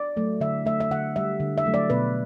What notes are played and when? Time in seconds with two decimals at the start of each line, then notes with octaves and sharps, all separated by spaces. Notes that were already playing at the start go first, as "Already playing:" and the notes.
Already playing: D5
0.16 F#3 A3
0.41 D3 E5
0.66 A3 E5
0.80 E5
0.90 D3 F#5
1.16 G3 E5
1.40 D3
1.58 E5
1.65 F#3 A3
1.74 D5
1.90 B2 B4